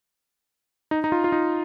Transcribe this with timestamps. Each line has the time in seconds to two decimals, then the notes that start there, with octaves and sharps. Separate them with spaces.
0.91 D#4
1.04 D#4
1.12 F4
1.24 F4
1.32 D#4